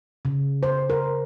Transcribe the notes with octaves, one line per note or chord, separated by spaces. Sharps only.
C#3
C5
A#4